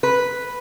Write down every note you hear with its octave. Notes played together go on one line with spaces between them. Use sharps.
B4